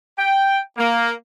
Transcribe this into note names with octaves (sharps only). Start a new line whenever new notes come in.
G5
A#3